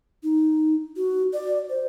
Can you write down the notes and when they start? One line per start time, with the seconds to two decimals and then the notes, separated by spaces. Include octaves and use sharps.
0.23 D#4
0.97 F#4
1.33 D5
1.70 C5